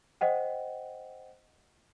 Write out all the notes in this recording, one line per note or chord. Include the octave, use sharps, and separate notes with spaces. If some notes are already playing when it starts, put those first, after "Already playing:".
C5 D#5 F#5 G5